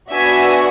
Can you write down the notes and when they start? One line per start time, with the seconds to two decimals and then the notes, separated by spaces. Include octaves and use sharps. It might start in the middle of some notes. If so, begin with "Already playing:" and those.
0.11 B3 D4 F#4 E5 G#5